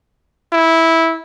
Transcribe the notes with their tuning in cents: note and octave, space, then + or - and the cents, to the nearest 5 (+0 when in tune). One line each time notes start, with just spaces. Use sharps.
E4 -10